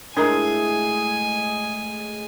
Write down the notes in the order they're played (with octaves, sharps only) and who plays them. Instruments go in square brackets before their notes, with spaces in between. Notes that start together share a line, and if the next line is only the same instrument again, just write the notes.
[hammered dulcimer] A2 G#3 G#4 [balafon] D4 A#4 A#5 [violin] G#5